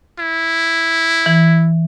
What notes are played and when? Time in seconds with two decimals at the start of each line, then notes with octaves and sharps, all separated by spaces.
0.19 E4
1.26 E3